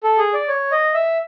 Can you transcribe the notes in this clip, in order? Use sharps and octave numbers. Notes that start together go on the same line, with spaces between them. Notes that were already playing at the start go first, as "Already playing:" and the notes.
A4
G#4
D5
C#5
D#5
E5